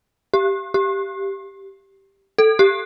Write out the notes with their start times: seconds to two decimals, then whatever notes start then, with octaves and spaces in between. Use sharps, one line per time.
0.34 G4
0.74 G4
2.38 A4
2.59 G4